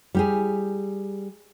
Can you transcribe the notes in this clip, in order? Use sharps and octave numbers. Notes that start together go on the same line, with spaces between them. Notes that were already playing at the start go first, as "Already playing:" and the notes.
G3 G4 G#4